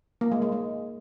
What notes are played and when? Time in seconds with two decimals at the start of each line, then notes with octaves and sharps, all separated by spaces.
0.21 A#3
0.32 G#3
0.42 G#3
0.52 G#3